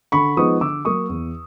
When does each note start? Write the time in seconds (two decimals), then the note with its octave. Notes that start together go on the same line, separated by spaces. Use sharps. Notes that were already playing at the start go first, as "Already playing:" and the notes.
0.12 D3 B5 C#6
0.37 F3 G#3 B3 D#4 C#6 D#6
0.61 D3 D6 E6
0.85 F#3 A#3 C#6 D#6
1.09 E2